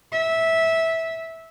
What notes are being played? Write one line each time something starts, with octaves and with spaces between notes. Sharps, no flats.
E5